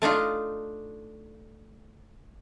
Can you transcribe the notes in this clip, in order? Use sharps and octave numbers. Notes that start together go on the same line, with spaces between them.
A3 D4 D#4 F4